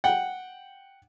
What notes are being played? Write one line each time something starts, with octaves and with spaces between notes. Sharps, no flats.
F#5 G5